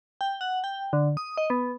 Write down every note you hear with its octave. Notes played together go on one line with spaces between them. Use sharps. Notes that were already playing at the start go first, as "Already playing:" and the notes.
G5
F#5
G5
D3
D#6
D#5
B3